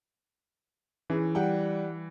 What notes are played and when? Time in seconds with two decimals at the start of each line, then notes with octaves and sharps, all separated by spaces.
1.10 E3 C#4 G#4
1.35 G3 G4 F#5 G5